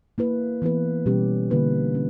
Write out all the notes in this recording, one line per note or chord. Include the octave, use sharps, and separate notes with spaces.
A#3 E4 B4
E3 B3 E4 B4
B2 G3 C#4 G4
D3 A#3 E4 B4
C#4